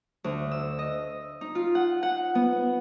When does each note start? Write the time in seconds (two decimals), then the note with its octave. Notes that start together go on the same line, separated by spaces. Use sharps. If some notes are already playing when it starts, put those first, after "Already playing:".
0.24 D2
0.51 E6
0.79 D#5
1.41 D#4
1.55 F4
1.75 F#5
2.03 F#5
2.35 B3